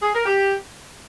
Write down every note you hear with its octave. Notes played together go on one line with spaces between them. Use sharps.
G#4
A#4
G4